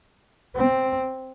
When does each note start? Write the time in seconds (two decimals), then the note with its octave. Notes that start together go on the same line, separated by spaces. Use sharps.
0.56 C4